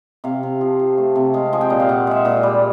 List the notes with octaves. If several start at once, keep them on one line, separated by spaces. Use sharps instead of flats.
C3 F5
C3
F3
F3
A3
C3
G#3 F5
F3 G#5
G5
A#2
F5
A#2 F#5
G#3 E5
F5
A#2
G3